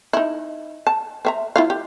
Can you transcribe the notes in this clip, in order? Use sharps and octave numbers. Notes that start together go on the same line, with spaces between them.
D#4 E4
A5
C4 E5 A#5
E4 F4 F5
G4